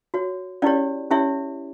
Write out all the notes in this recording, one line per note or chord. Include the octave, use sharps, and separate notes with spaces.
F#4 C#5
C#4 E4 G4 C#5 D5
C#4 E4 G4 C#5 E5